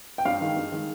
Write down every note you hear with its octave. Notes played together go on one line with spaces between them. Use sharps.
G5
G2 F5
D#3 G#3
G2
D#3 G#3